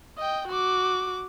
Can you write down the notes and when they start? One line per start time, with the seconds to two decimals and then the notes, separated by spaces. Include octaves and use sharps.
0.18 D#5 G5
0.48 F#4 D6